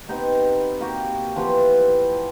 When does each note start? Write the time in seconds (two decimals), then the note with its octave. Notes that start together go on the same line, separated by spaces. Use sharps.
0.09 B3 C4 D#4 G4
0.80 A#3 F#4 G4 A#4
1.35 E3 F3 B3 G4